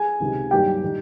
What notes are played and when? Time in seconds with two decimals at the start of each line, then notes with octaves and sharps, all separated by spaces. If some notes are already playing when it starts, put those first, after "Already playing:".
Already playing: G#4 G#5
0.20 C#2 C3 D#3
0.51 G2 D#3 F#3 A#3 G4 G5
0.84 D#3 G3